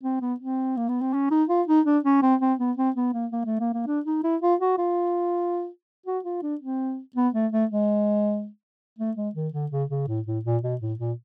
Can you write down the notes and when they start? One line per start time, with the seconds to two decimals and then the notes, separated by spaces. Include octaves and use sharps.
0.04 C4
0.21 B3
0.40 C4
0.77 A#3
0.89 B3
1.01 C4
1.13 C#4
1.31 D#4
1.49 F4
1.68 D#4
1.86 D4
2.04 C#4
2.23 C4
2.41 C4
2.59 B3
2.77 C4
2.96 B3
3.14 A#3
3.32 A#3
3.46 A3
3.60 A#3
3.74 A#3
3.87 D4
4.06 D#4
4.24 E4
4.42 F4
4.61 F#4
4.78 F4
6.06 F#4
6.25 F4
6.42 D4
6.61 C4
7.16 B3
7.34 A3
7.52 A3
7.71 G#3
8.99 A3
9.17 G#3
9.35 D#3
9.54 D3
9.72 C#3
9.90 C#3
10.08 A2
10.26 A2
10.45 A#2
10.63 B2
10.81 A2
11.00 A#2